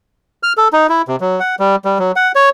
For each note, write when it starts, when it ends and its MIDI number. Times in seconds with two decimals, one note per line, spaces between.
0.43 0.53 89
0.57 0.68 69
0.73 0.87 63
0.89 1.02 64
1.08 1.16 48
1.21 1.40 54
1.40 1.55 78
1.59 1.76 55
1.85 1.98 55
1.99 2.12 54
2.16 2.32 78
2.35 2.49 73